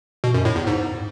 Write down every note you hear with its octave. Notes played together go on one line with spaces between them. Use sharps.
B2
F#2
A2
E2
G#2